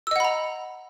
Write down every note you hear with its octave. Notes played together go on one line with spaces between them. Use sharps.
D#5 F#5 A#5 B5 E6